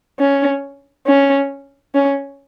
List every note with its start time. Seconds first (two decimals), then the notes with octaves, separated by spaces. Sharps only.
0.20 C#4
1.07 C#4
1.95 C#4